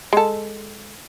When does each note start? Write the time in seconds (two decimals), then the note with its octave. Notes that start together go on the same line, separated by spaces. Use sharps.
0.13 G#3 A4